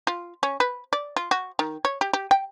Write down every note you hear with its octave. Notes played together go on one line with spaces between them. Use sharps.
F4
C#4
B4
D5
F4
F#4
D#3
C#5
G4
G4
G5